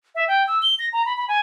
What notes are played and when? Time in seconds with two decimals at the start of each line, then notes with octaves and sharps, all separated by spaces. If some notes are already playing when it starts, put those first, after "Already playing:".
0.15 E5
0.28 G5
0.48 E6
0.62 G7
0.79 A#6
0.93 A#5
1.06 B5
1.17 B5
1.28 G#5